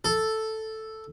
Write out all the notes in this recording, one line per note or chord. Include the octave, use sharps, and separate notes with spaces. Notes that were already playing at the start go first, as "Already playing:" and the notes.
A4